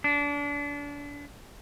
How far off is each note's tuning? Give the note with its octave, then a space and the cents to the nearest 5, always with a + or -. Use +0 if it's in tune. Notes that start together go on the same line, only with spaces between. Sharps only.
D4 -30